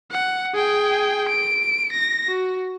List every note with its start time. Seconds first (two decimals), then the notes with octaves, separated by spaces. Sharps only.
0.11 F#5
0.54 G#4 G5
1.29 D7
1.92 A#6
2.28 F#4